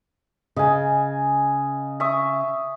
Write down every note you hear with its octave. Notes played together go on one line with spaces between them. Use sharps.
C#3 D#5 G#5
E5 C#6 D#6